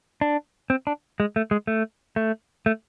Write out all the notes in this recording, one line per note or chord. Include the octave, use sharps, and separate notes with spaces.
D4
C4
D4
G#3
A3
G#3
A3
A3
A3